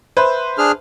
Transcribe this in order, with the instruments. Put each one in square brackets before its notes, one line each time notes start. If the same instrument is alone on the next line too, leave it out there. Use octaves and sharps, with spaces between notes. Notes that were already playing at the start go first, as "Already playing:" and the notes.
[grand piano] B4 C5 E5
[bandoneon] D4 G#4 F6